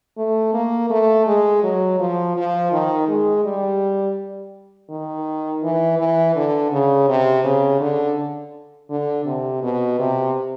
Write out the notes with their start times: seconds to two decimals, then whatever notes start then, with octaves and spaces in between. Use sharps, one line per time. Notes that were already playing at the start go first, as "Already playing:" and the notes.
0.18 A3
0.54 A#3
0.90 A3
1.27 G#3
1.63 F#3
2.00 F3
2.36 F3
2.72 D#3
3.08 G#3
3.45 G3
4.90 D#3
5.63 E3
5.99 E3
6.35 D3
6.72 C#3
7.09 C3
7.44 C#3
7.80 D3
8.90 D3
9.26 C3
9.63 B2
9.99 C3